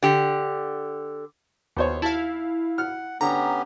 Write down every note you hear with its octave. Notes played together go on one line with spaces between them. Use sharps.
D3 G4
D#2 B3 C5 C#5
E4 F5 A5
F#5 F6
D3 B3 C#4 G4 A#5